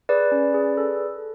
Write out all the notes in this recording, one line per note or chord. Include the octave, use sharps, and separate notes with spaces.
G#4 B4 D5
C#4
G#4
A4